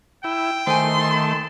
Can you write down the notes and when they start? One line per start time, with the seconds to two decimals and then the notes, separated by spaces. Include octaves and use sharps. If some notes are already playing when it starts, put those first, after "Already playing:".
0.24 E4 G5
0.67 D#3 A3 C5 G#5 C6
0.99 A5